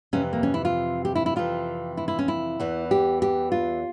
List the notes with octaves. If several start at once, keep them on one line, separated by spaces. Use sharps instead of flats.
F2 C3 E3 C#4
A#3
C#4
E4
F4
G4
E4
E4
F2 C3 E3 F4
E4
E4
C#4
E4
E2 E3
G4
G4
F4